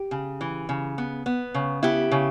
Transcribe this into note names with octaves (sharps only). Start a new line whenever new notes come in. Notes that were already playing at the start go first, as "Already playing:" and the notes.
Already playing: G4
C#3
E3
C#3
B3
B3
C#3
B3 E4 G4
C#3